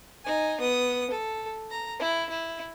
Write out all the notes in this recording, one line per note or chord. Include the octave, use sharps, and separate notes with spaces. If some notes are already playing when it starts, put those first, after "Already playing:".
D#4 G#5
B3 D#6
A4
A#5
E4
E4